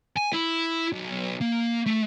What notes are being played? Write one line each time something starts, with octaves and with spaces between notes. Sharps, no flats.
G#5
E4
B1
A#3
A3